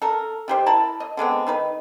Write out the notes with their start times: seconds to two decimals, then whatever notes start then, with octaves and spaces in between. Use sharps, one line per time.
0.02 A4 A#4
0.48 D#3 G4 C5
0.66 E4 A#4 A5 B5
1.00 D#5
1.17 D3 G#3 B3 C4
1.47 D#3 D#4 B4